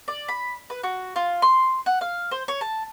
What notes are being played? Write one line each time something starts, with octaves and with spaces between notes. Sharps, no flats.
D5
B5
B4
F#4
F4
C6
F#5
F5
C5
C#5
A5